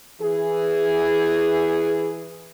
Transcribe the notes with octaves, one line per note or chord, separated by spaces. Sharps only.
E3 G#4